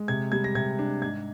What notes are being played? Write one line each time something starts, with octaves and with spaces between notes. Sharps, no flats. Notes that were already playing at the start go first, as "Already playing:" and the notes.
Already playing: G#3
C3 G#6
G3 G#6
A#6
C3 G#6
D4
G#2 G#6